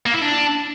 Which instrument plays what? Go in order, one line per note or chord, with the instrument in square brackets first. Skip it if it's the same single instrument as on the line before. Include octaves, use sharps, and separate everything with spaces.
[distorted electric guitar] A#3
E4
D4